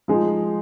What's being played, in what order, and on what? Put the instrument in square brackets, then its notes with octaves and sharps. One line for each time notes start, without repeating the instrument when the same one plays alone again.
[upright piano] F3 G#3 D#4